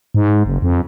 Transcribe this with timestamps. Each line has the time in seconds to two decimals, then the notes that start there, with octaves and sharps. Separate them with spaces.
0.14 G#2
0.45 F#1
0.62 F2